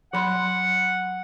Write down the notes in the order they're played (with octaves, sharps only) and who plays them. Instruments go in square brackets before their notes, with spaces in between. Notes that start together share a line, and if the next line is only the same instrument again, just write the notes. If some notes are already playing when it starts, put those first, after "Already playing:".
[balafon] F#3 B5 C6 [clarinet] F#5